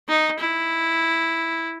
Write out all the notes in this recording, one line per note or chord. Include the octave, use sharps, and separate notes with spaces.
D#4
E4